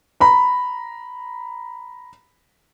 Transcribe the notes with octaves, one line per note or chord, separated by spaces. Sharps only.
A#5 B5